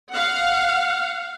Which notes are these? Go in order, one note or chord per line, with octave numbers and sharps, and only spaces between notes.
F5 F#5